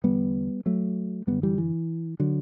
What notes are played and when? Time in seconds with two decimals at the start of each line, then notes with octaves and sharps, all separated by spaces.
0.04 E2 D3 G3 B3
0.66 F#3 A3
1.27 F#2 D3 G3 B3
1.43 E3 G3
1.58 E3
2.20 D3 F#3